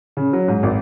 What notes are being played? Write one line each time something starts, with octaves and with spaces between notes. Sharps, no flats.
C#3
F#3
G#2
G#1